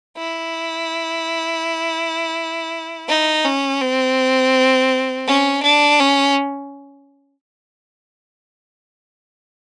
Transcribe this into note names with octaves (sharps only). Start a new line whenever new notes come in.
E4
D#4
C#4
C4
C#4
D4
C#4